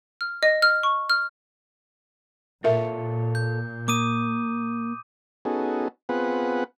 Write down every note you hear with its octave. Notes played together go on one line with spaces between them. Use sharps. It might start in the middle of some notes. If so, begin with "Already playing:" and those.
F6
D#5
F6
C#6
F6
A#2 F4 A4 A#4 C#5 E5
G6
A#3 D6 D#6 D#7
B3 C#4 D#4 F#4 G#4 A4
B3 C4 F4 G#4 B4 F#5